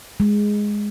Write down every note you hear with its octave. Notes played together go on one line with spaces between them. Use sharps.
G#3